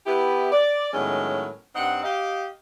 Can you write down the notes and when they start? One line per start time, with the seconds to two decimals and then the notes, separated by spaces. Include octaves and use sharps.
0.06 B3 E4 G4
0.52 D5
0.93 A2 D#3 F#3 G#3 B3 C#4
1.75 G2 C4 D#4 F#5
2.03 G4 D#5 F5